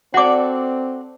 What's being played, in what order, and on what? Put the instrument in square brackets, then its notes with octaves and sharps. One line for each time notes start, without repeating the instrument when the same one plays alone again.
[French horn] C4 [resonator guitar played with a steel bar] F#4 A4 D5 [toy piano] F#5 D6